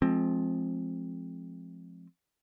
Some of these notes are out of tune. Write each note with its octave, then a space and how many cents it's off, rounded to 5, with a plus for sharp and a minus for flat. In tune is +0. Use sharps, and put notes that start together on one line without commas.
F3 +0 G#3 +35 C4 +15